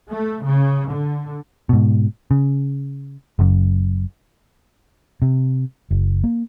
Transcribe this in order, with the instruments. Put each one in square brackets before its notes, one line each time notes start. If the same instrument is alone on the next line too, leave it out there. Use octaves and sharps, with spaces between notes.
[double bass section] A3
C#3
D3
[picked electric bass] G#2 B2
C#3
F#1 F#2
[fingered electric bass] C3
F#1
A#3